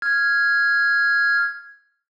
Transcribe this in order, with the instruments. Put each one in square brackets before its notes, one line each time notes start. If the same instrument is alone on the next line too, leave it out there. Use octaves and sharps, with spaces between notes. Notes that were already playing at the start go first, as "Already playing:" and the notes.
[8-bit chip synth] F6 G#6